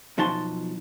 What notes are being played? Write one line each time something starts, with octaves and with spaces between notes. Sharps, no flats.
B1 F3 D#4 F#4 A5 C6